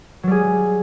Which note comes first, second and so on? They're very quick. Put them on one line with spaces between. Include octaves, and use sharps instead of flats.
F#3 G3 G#4